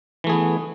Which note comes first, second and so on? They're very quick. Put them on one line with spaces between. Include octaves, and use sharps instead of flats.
E3 A3 G#4 B3